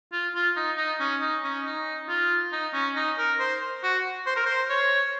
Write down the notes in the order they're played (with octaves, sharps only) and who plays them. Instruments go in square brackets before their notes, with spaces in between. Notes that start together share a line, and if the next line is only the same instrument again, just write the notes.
[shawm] F4
F4
D#4
D#4
C#4
D#4
C#4
D#4
F4
D#4
C#4
D#4
A#4
C5
F#4
C5
A#4
C5
C#5